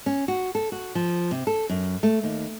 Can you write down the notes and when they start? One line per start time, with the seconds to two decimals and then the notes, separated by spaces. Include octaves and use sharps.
0.06 C#4
0.28 F#4
0.55 A4
0.72 F#4
0.95 F3
1.31 C3
1.47 A4
1.70 F#2
2.03 A3
2.24 D#2